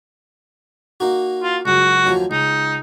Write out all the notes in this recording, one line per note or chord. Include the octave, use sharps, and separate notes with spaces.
A#3 D#4 F#4
F4
C#2 F#2 F#4
D#2 F3 F#3
C#2 D#4